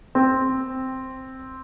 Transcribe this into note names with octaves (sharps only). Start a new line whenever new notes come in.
C4